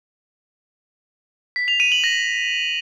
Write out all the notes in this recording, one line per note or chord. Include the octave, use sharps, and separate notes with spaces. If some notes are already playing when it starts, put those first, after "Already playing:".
B6
F7
D#7
F#7
A#6